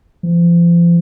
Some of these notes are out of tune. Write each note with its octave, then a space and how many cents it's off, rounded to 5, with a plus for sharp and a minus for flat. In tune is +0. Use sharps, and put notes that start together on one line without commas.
F3 -35